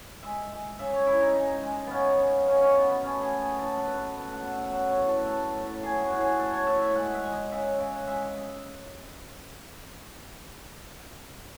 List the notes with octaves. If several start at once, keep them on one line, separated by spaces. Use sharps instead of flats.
G#3 E5
G#3
C#3 E5
C#5
C#3 E4
D#4
G#3 D#4
G#3
C#3 B3 C#4
C#3
F#3 C#4
C#4
B2 B3
B3
A3 C#4
G#4
B2
G#4
F#3 A4
B4
B2
B4
A3
F#5
B2
E5
F#5
F#3 E5
C#5
A2
A4
A3 A4
A2
F#3 G#4
F#4
A2
G#4
A3 A4
C#5
A2 E5
E5
G#3 F#5
E5
G#3
D#5
C#3 E5
C#3
G#3 E5